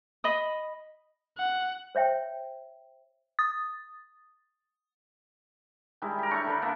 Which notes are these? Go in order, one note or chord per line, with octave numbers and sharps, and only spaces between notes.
D#5 B5 D#6
F#5
C5 C#5 E5 G5
D#6 A6
D#3 G3 G#3 E4
G4 A#4
A3 D4 C#5 C#6
D3 A#4 B4 D5
A#3 B3 E4